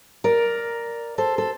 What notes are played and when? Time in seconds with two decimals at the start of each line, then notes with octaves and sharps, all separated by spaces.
0.24 A#4 D5
1.18 A4 C5
1.38 A4